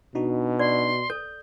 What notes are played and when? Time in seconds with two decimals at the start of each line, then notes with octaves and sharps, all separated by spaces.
0.15 B2 D4 D#4 F#4
0.59 D5 C6
1.10 A4 G6